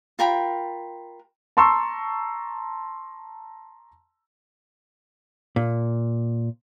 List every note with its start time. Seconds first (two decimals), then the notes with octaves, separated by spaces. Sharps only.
0.19 F4 A#4 G5 B5
1.57 A5 A#5 C6 C#6 E6
5.56 A#2